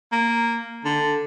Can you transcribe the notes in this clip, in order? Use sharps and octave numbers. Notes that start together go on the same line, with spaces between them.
A#3
D3